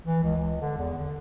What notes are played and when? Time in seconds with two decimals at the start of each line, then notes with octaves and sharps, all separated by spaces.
0.06 E3
0.23 C#2
0.37 C#2
0.62 D3
0.78 E2
0.98 D3